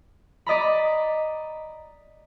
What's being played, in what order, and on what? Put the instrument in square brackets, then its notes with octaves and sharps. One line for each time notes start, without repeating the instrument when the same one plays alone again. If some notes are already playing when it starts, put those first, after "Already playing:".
[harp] D5 D#5 A#5 B5